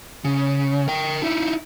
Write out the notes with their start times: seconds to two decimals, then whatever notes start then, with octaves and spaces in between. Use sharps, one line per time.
0.25 C#3
0.88 A#4 G5
1.22 D#4 E4